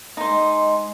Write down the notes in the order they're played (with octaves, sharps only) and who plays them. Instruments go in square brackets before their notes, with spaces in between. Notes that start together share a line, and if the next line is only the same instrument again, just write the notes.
[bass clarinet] G#3 [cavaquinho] D#4 C5